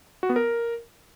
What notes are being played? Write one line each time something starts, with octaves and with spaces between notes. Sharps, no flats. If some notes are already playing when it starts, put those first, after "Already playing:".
F#4
B3
A#4